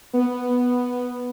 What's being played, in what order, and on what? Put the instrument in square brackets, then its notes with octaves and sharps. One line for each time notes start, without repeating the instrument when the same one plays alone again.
[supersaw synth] B3